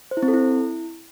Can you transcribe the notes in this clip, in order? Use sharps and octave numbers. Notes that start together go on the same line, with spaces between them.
C5
E4
C4
A4
E4